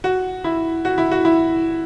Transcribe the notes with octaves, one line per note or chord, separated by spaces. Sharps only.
F#4
E4
F#4
E4
F#4
E4